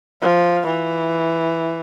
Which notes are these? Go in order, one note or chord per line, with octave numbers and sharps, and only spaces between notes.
F3
E3